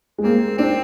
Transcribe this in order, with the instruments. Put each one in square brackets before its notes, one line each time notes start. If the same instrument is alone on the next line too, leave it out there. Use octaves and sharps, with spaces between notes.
[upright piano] G#3
[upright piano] A#3 [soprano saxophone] C4
[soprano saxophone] C4 [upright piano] D4